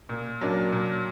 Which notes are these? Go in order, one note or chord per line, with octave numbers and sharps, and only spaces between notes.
A#2
F#3 A#3 D4
A#2